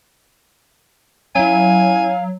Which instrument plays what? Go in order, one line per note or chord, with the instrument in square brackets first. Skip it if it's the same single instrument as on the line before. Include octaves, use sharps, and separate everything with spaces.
[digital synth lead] F#3 [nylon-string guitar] C#4 E4 [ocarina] F5 [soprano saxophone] G#5